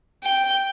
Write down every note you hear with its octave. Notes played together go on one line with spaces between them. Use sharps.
G5